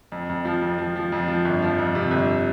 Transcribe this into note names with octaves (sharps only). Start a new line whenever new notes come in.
F2
F2
F3
F2
F3
F3
F2
F3
G1
F3
F2
C3
G1